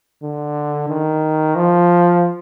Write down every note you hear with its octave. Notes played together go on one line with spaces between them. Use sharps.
D3
D#3
F3